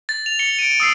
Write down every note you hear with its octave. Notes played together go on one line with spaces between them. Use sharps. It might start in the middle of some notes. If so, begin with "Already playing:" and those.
A6
F7
C#7 G7
D7 D#7
D#6 E6 C7